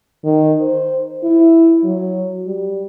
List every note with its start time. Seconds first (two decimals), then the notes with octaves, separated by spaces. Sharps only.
0.24 D#3
0.61 C5
1.23 E4
1.84 F#3
2.47 G3